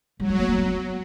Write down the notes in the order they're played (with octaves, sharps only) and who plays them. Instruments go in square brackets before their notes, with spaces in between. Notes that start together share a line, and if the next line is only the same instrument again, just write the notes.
[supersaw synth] F#3 [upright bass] G3
[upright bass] G#3
A#3
A3
B3